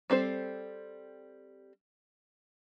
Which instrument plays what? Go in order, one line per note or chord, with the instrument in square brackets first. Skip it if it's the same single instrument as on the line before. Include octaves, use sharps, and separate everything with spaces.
[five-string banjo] G3 C4 A4 C5